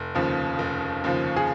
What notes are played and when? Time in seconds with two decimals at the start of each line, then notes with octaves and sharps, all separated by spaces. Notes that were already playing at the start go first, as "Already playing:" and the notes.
Already playing: F1
0.15 D#2 C#3 F3
0.59 F1
1.04 D#2 C#3 F3
1.36 G#4